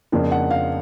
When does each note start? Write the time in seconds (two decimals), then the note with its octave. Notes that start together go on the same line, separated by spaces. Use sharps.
0.12 F2 C#3 F3 A#3 D4
0.32 F#5
0.51 F5